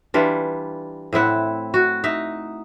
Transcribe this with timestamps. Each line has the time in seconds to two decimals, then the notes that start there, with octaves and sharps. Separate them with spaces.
0.14 E3 G3 D4 F4
1.13 A2 C4 E4 F#5
1.74 F#4
2.04 D#4 E5